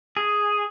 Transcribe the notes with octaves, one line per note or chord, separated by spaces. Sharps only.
G#4